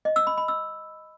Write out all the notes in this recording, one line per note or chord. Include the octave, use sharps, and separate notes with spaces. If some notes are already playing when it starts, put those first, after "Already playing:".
D#5
E6
B5
B5
E6